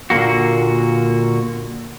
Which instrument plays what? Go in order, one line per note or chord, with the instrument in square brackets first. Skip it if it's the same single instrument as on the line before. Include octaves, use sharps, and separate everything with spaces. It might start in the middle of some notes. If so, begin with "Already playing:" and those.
[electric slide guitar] A#2 D3 F3 A#3 F#4